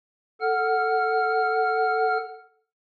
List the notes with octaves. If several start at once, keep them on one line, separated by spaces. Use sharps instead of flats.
A4 F#5 F6